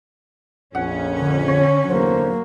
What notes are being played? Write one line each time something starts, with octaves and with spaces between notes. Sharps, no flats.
A#1 F2 C#4 F#5
D3
D3 C#5
E2 D3 F#3 A#3 C5